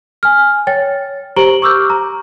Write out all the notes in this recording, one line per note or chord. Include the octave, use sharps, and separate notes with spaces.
G#5 F6
C#5 G5 A6
G4 C5 A#5 D7 F#7 G7
C#6 D6 E6 F6 G6
A#5